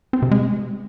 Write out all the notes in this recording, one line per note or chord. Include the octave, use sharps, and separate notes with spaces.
C4
C3
G#3